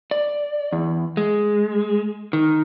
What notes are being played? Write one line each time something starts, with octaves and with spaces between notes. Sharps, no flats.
D5
E2
G#3
D#3